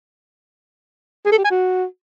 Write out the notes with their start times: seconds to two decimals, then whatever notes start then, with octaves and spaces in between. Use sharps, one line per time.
1.26 G#4
1.32 A4
1.38 G4
1.44 G#5
1.51 F#4